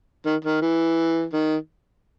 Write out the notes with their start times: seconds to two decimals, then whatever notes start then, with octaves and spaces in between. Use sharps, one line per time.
0.26 D#3
0.45 D#3
0.62 E3
1.33 D#3